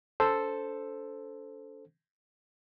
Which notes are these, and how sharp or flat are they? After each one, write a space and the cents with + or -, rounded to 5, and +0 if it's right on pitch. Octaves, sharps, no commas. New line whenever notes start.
D4 -35 A4 +0 C5 +0